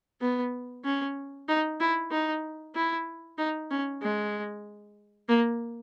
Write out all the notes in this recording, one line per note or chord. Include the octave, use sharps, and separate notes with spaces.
B3
C#4
D#4
E4
D#4
E4
D#4
C#4
G#3
A#3